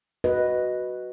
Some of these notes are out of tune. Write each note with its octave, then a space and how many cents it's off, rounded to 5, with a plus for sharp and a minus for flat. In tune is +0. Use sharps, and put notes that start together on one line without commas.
F#4 +0 B4 +0 D#5 +0